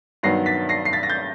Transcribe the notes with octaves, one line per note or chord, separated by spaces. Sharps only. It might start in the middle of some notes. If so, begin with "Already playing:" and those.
G2 D#3 F#3 B3 A#6 C7
A6 B6
A#6 C7
C7
A6 B6
A#6
G6 A6